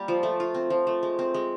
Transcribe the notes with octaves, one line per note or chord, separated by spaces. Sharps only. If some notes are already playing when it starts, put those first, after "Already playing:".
Already playing: G3 A#3
F3
A3
F4
C4
F3
A3
G#3
C4
G#3